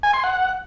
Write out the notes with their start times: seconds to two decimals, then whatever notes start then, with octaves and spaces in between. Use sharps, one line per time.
0.03 G#5
0.13 C6
0.24 F#5